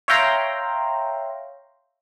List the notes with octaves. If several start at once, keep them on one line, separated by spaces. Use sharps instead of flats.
C#5 E5 F5 G5 A#5 C6